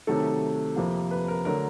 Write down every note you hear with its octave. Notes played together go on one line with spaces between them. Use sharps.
C3 D#3 F#3 A3 A4
F2 C3 F3 A#3
B4
A#4
D3 F#3 A3 A#4